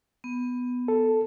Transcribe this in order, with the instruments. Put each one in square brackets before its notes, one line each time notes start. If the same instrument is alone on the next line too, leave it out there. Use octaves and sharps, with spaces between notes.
[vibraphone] B3
[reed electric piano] A4